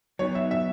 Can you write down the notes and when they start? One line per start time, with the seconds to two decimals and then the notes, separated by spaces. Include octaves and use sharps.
0.19 F#3 B3 D#4 F#4 B4 C#5
0.35 E5
0.51 E5